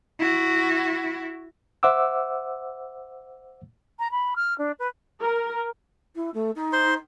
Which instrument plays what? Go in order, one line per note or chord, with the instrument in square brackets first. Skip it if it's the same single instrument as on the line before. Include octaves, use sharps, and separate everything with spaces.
[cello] E4 F#4
[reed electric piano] C5 E5 F#5 D6 E6
[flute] A#5
B5
F6
D4
B4
[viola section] A#4
[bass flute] E4
A3
D#4
[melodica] C5 C6